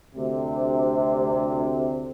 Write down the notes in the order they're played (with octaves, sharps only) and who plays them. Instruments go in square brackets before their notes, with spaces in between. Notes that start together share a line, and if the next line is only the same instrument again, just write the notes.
[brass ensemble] D2 C3